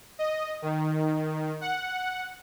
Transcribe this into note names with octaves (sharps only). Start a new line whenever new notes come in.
D#5
D#3
F#5